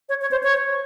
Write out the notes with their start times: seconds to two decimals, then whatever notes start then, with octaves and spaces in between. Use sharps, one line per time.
0.09 C#5
0.21 C#5
0.31 C5
0.43 C#5